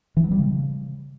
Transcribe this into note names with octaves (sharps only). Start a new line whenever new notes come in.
E3
F#3
G3
C#3